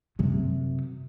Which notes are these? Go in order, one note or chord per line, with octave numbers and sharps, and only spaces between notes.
F#2 C3